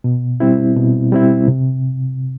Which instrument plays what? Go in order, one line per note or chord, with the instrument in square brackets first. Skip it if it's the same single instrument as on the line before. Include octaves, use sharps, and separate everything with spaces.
[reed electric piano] B2
G3 C4 E4
B2
G3 C4 E4
C3